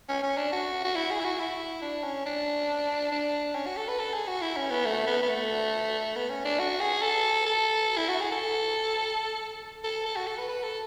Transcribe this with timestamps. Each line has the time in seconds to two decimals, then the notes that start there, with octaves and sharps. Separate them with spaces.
0.09 C#4
0.23 C#4
0.37 D4
0.52 F#4
0.84 F#4
0.95 E4
1.11 G#4
1.20 E4
1.25 F#4
1.39 E4
1.82 D4
2.04 C#4
2.26 D4
3.12 D4
3.55 C#4
3.66 F#4
3.77 A4
3.88 B4
3.99 A4
4.14 G#4
4.28 F#4
4.42 E4
4.57 C#4
4.71 B3
4.86 A3
5.07 B3
5.22 B3
5.29 A3
6.16 B3
6.30 C#4
6.45 D4
6.59 F#4
6.80 G#4
7.02 A4
7.46 A4
7.97 E4
8.09 F#4
8.21 G#4
8.32 A4
9.84 A4
10.06 A4
10.16 F#4
10.27 A4
10.38 B4
10.49 B4
10.63 A4